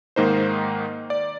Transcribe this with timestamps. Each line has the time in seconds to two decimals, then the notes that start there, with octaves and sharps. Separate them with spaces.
0.16 G#2 D#3 A#3 D#4 C5
1.10 D5